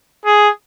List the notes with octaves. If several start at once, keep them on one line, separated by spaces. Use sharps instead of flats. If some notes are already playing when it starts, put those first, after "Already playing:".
G#4